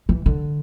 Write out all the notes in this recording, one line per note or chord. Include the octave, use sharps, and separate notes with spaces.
E3
D3